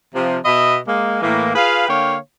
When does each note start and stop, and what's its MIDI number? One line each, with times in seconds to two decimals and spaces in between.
0.15 0.38 48
0.15 0.38 53
0.45 0.79 47
0.45 0.79 59
0.45 0.79 75
0.45 0.79 76
0.45 0.79 83
0.87 1.20 56
0.87 1.20 58
1.22 1.53 45
1.22 1.53 52
1.22 1.53 58
1.55 1.85 65
1.55 1.85 68
1.55 1.85 71
1.55 1.85 77
1.88 2.17 50
1.88 2.17 58
1.88 2.17 73
1.88 2.17 77
1.88 2.17 79